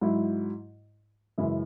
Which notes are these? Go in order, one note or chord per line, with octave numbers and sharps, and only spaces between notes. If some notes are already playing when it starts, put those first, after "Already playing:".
G#2 F#3 E4
F#2 C#3 E3 G#3 E4